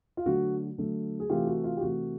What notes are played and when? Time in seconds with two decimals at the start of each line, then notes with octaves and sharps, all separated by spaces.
0.17 F4
0.26 D3 F#3 A3 F#4
0.78 D3 F#3 A3
1.20 G#4
1.30 C3 E3 A3 F4 G4
1.47 F#4
1.64 F4
1.77 G4
1.81 C3 E3 A3 F#4